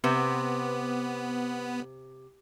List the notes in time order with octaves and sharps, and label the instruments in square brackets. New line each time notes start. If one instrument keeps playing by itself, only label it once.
[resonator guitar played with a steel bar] C3 [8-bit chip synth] B3